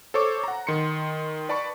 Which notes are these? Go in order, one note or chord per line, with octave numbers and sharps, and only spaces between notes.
A4 C5 C#5 C#6 D6
F#5 A#5
D#3 C6 C#7
B4 D5 A5 B5 C#6